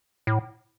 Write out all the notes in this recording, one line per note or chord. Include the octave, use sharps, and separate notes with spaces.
A2